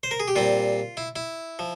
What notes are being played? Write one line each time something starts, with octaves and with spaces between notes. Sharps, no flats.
C5
A#4
G#4
G4
A#2 G3 C4 F4
E4
E4
F3